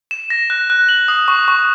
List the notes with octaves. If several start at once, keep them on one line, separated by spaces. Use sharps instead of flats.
E7
A#6
F#6
F#6
F#7
D#6
C#6
C#6